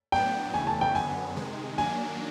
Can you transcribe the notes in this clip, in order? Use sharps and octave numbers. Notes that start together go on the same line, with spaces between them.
A2 F#3 B3 D4 G5
D#2 C#3 E3 A3 G#5
A5
G5
F#2 D3 F#3 B3 G#5
C3 D#3 G#3
D#3 F#3 A#3 D4 G#5